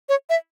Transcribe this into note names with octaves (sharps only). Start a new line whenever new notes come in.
C#5
E5